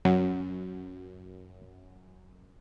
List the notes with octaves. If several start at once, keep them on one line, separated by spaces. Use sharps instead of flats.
F#2 F#3